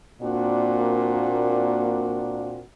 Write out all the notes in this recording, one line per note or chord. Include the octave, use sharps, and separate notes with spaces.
A#2 A#3 C4 D4 F#4